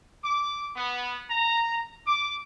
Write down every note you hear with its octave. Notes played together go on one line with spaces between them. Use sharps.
D6
B3
A#5
D6